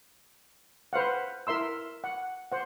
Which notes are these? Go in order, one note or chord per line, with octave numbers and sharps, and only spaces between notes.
B4 C5 F5 F#5
E4 A#4 E5 C6 E6
F#5
C5 F#5